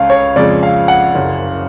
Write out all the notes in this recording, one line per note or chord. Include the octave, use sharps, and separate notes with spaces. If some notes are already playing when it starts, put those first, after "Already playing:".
Already playing: C#2 C#3 G#3 C#4 F5
C#5
F2 C#3 F3 G#3 D5
F5
F#5
F#1 F#2 C#3